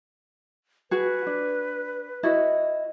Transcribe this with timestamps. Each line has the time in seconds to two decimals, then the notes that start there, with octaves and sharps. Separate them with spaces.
0.91 F#4 G#4 B4
1.27 D4
2.23 E4 F#4 D#5